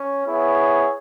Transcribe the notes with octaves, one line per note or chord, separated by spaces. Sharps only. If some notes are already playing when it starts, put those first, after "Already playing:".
Already playing: C#4
B3 E4 G#4 C#5